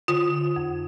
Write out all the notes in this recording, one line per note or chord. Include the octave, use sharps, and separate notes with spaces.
D3 F4
F2